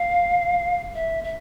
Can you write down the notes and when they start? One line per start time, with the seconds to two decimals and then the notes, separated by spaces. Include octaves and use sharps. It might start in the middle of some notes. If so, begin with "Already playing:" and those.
Already playing: F5
0.95 E5
1.24 E5